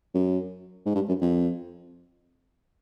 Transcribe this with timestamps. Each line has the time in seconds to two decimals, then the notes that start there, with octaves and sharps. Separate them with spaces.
0.14 F#2
0.86 G#2
0.95 G2
1.08 F#2
1.21 F2